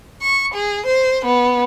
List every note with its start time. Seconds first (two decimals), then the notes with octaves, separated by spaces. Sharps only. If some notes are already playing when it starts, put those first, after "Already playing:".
0.21 C#6
0.53 G#4
0.85 C5
1.26 B3